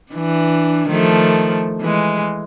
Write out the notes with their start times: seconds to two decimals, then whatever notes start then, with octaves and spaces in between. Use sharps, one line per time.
0.12 E3 D4
0.89 D#3 F3 A3
1.80 E3 G#3